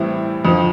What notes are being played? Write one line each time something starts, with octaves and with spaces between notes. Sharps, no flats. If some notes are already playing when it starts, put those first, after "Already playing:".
Already playing: A2 E3 G3 C4 E4
F2 D3 F3